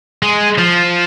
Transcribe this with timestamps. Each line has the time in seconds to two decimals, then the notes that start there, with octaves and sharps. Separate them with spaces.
0.23 G#3
0.58 F3